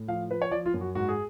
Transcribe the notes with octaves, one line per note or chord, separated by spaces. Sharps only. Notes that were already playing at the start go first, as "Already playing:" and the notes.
Already playing: A2
F3 F5
F3 B4
C#5
F3 D5
F4
F#2
F#4
G#2 F#4
G#4